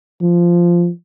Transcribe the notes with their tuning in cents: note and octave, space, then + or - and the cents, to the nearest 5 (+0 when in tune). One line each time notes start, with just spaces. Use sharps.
F3 -10